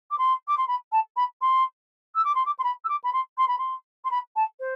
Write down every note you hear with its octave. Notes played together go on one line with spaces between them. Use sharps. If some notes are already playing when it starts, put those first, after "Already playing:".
D6
C6
D6
C6
B5
A5
B5
C6
E6
D6
C6
D6
C6
B5
E6
D6
B5
C6
C6
B5
C6
C6
B5
A5
C5